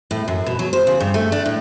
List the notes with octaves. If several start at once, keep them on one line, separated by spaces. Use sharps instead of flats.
A2
F#2
B2
F#3
C5
C#3
G2
A3
D4
A2